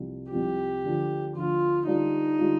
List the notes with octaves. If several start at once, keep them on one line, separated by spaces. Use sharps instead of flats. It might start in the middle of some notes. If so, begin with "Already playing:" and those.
Already playing: C2 C3 F3
C2 C3 F3 G4
D2 D3 F3
D2 D3 F3 F4
D3 G3 D4 D#4 F4
D3 G3 D4 F4